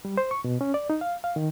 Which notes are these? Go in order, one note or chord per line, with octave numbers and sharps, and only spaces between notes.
G3
C5
C#6
B2
C#4
D5
D#4
F5
F5
D#3